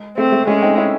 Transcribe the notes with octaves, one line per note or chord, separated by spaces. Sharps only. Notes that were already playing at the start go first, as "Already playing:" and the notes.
Already playing: G#3
A3 C4
A3
G#3 A3 C#4
C4 D#4
C#4 E4